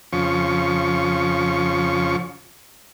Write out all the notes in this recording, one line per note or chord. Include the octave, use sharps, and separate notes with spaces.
F2 C#3 F3 C#6